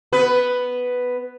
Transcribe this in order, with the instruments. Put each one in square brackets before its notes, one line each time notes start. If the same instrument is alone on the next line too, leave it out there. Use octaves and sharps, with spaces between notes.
[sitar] B3 B4